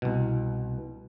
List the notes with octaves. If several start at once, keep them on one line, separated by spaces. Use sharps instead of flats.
C2 B2